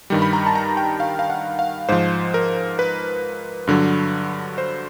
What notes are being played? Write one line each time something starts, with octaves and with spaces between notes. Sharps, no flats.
G2 D#3 G3
B5
A#5
A5
A#5
G5
F5
F5
F#5
F5
G#2 F3 C5
A#4
B4
G2 D3 F#3
C5